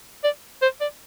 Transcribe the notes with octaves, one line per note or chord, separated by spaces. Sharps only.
D5
C5
D5